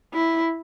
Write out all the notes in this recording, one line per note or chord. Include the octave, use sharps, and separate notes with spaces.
E4